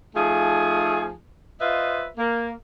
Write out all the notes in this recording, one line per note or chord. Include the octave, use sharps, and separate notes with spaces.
F3 A3 D#4 G#4
F4 B4 C5 D#5 E5
A#3